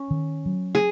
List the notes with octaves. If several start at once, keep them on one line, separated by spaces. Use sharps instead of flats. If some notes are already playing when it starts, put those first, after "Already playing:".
Already playing: C#4
D#3
F#3
G#4